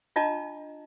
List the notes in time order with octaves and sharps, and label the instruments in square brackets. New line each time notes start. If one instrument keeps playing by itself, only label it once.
[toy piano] D4 F4 D#5 A5 A#5